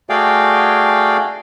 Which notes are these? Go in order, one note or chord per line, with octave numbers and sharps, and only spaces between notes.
A3 F#4 G#4 D5 F5 G5